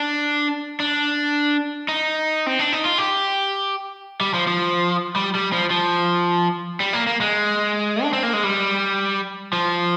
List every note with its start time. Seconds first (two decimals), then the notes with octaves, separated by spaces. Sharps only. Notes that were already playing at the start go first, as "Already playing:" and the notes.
Already playing: D4
0.80 D4
1.88 D#4
2.46 C4
2.59 D4
2.72 D#4
2.85 F4
2.98 G4
4.21 G3
4.34 F3
4.47 F3
5.16 G3
5.35 G3
5.53 F3
5.71 F3
6.80 G3
6.93 A#3
7.07 A#3
7.21 G#3
8.03 D4
8.13 C4
8.23 A#3
8.33 G#3
8.43 G3
9.53 F3